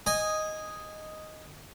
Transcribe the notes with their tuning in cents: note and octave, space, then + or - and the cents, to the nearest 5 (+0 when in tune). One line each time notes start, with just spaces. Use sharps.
D#5 +0 G#5 -15